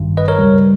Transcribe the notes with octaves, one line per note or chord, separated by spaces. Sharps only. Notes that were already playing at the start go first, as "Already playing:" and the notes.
Already playing: G#1 G2 D#3
B4 D#5
A#4 C#5
C#2 C#3 G3